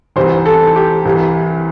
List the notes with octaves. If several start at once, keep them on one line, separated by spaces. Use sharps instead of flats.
C2 C3 E3 C5
A4
G4
C2 C3 E3